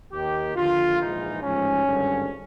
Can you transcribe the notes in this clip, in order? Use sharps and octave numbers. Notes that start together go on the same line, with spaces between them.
D#2 D#3 G4
D#2 D3 F3 F4
A#1 G#2 E3 D#4
A1 G#2 F3 C#4
G#1 G2 D3